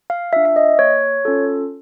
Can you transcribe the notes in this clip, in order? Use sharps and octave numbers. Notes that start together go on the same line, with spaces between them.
F5
D4 F4 E5
E5
D#5
A#3 C#5
C#4 F4 A4